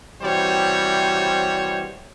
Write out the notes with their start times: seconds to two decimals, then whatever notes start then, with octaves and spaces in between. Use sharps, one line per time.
0.22 C3 E3 G3 F#4 C5 C#5